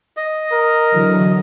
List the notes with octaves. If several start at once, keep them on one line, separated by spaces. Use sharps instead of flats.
D#5
A#4
D3 E3 F#3